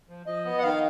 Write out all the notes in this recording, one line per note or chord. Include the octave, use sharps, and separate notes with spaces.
F3
F3 D#5
B3
F#5
D#3 F5